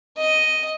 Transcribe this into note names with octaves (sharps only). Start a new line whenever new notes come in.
D#5